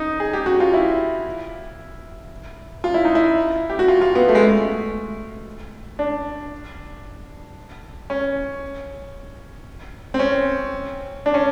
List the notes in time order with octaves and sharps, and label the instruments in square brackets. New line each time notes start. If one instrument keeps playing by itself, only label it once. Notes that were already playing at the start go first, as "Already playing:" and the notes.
Already playing: [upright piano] D#4
G#4
G4
F#4
F4
E4
F4
E4
D#4
E4
G4
F#4
F4
F4
B3
A3
G#3
A3
D4
C#4
C4
C#4
D4
C#4